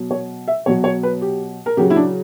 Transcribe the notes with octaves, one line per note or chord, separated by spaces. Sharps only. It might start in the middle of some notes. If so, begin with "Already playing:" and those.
Already playing: B2 F#3
C#5
E5
B2 F#3 C#5
C#5
B4
G4
A#4
C#3 F#3 G4
E4
D4